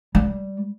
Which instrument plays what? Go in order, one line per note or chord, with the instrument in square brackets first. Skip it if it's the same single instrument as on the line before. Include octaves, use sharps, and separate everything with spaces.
[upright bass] G3